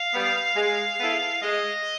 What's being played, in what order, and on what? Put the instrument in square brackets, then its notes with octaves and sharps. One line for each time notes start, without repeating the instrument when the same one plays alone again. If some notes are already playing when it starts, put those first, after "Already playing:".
Already playing: [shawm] F5
[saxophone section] G3 B3
G#3
B3 E4 A4
[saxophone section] G#3 [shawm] D#5